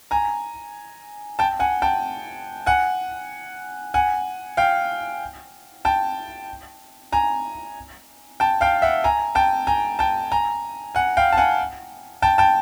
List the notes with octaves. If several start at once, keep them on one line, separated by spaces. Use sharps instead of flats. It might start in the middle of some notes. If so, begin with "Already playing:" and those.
G#5 A#5
G5 A5
F#5 G#5
G5 A5
F#5 G#5
F#5 G#5
F5 G5
G5 A5
G#5 A#5
G5 A5
F5 G5
E5 F#5
G#5 A#5
G5 A5
G#5 A#5
G5 A5
G#5 A#5
F#5 G#5
F5 G5
A5
F#5 G#5
G5 A5
G5 A5